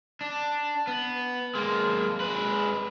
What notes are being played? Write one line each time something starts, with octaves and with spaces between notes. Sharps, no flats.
D4
B3
G#3 A#3
G#3 B4